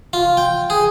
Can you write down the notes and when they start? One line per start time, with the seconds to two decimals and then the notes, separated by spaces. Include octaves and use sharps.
0.13 F4
0.37 G5
0.70 G#4